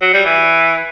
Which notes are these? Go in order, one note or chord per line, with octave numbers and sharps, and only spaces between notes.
F#3
G3
E3